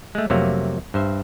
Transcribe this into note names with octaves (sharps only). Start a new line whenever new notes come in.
G#3 A3
F2 C3 F#3 A3 A#3
G2 C5 E5